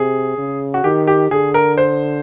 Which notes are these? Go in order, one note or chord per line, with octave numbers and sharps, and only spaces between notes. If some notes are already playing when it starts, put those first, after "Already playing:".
Already playing: C3 G#4
C#3
F#4
D#3 G4
G4
D3 G#4
A#4
C5